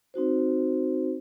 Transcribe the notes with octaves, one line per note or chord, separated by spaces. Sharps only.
C4 D#4 F#4 C5